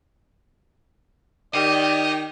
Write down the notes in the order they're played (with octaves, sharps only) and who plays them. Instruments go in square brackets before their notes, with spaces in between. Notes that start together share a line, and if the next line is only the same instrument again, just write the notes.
[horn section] D#3 [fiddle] G4 [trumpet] D5 [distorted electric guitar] D#5